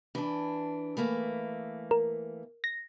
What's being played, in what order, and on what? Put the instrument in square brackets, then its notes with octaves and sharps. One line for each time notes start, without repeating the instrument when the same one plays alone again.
[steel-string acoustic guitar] E3 D4
E3 A3 A#3
[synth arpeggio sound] A#4
A#6